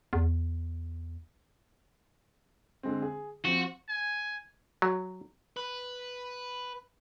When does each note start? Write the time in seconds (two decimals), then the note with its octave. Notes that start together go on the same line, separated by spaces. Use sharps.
0.13 E2
2.83 D3 G#3 C4
3.02 G#4
3.45 F3 C4 F#4
3.89 G#5
4.82 F#3
5.57 B4